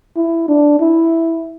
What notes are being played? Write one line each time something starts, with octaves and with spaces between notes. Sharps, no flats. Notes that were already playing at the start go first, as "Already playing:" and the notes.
E4
D4
E4